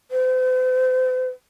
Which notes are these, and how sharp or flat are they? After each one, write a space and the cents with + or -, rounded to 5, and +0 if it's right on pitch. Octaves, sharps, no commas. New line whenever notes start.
C5 -40